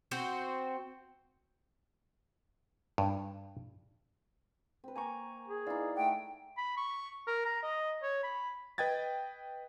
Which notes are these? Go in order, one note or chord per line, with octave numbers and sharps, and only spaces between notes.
C4 F#4 C5
G2
C4 B4
A#3 G5 G#5 A#5 C#6
G#4
E3 D#4 D5 F5
A3 F#5 G5
B5
C#6
A#4
A#5
D#5
C#5
B5
B4 D#5 G5 G#6 A6